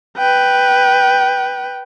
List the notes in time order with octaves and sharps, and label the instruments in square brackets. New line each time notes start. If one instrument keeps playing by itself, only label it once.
[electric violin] B4 G5